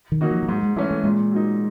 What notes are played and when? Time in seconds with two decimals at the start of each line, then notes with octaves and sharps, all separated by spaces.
0.12 D#3
0.21 F#3 A#3 D#4 F#4
0.31 F3
0.43 F3
0.48 G#2 F#3
0.63 G#3
0.76 E3 G#3 A3 C#4
0.91 A3
1.04 A#2 G#3
1.31 F#3 A#3 D#4